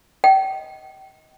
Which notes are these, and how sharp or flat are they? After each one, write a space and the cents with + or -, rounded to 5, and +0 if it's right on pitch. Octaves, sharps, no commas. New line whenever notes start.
D#5 +20 G5 -35